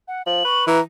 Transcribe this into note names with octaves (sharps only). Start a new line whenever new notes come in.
F#5
F3 F#7
B4 C#6
E3 A#5